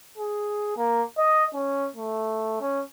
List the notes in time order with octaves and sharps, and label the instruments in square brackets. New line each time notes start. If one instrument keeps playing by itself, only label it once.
[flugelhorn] G#4
A#3
D#5
C#4
A3
C#4